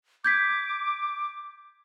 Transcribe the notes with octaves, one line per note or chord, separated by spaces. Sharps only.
D6 G6 G#6 B6